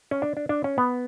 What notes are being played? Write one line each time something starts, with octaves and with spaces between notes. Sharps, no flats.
C#4
D4
D4
D4
C#4
B3